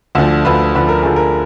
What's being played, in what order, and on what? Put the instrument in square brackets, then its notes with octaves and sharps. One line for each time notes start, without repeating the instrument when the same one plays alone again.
[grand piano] D2 D3 F3
D2 D3 F3 B4
D2 D3 F3 B4
A#4
D2 D3 F3 G#4
A#4